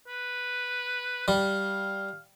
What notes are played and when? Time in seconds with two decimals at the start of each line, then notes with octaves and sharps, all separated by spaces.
0.07 B4
1.28 G3 F5